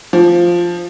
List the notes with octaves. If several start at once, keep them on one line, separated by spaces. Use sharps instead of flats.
F3